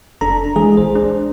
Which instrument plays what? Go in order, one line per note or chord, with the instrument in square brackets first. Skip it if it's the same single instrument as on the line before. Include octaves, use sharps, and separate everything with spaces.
[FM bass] F1 [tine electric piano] D4 A4 A#5
[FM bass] E3 [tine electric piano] G#3 G#4
[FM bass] B1 [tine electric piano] C5
[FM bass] D4